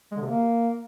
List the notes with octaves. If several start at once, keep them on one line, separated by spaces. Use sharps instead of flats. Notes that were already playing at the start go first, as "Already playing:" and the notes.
G#3
D3
C3
A#3